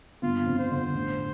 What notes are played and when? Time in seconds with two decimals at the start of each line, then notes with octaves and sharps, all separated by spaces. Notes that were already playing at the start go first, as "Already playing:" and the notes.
0.22 G1 F4
0.47 F2
0.59 C5
0.71 D3
0.94 A1